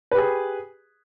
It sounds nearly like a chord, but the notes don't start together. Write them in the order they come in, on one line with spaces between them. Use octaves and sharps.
B4 G4 G#4